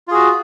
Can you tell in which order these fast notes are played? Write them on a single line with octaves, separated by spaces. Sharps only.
F4 G#4 F#4